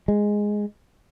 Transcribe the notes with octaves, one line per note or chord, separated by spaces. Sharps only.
G#3